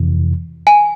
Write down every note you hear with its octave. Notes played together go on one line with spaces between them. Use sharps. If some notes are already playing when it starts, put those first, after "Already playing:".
Already playing: F2 C3 E3
G#5